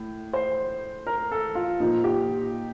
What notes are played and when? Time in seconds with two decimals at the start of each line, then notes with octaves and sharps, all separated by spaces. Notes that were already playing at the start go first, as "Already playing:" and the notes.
Already playing: A2
0.33 C5
1.07 A#4
1.32 A4
1.55 F4
1.80 A#2 F3 D#4
2.04 G4